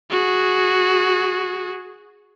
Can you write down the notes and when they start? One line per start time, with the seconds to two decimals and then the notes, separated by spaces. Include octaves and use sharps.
0.11 F#4 G#4